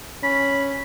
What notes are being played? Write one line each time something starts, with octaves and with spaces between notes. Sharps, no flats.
C#4 B5